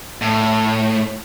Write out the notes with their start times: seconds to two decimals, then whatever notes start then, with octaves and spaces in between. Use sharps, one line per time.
0.22 A2